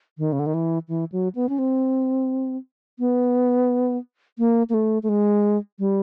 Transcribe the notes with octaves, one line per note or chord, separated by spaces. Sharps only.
D#3
C#3
D3
D#3
E3
E3
F#3
B3
C#4
C4
B3
A#3
A#3
A3
A3
G#3
G3